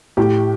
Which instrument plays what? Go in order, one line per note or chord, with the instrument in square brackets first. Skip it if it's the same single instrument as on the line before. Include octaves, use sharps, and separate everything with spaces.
[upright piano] A2 G4